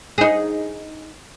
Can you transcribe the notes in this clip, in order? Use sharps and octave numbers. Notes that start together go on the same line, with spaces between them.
D#4 G#4